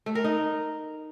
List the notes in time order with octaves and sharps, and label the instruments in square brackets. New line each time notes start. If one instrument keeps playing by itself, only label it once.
[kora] A3
A#4
D#4